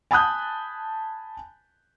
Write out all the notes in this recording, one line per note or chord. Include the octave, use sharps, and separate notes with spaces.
G#5 A5 B5 D#6 F#6 G6